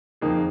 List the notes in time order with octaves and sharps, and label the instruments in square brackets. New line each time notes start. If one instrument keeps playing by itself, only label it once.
[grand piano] F2 D#3 A#3 D#4 G#4